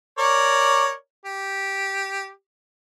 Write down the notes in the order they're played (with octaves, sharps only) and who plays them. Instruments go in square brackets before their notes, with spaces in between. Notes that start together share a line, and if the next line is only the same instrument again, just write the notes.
[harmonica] A#4 C#5 D5
G4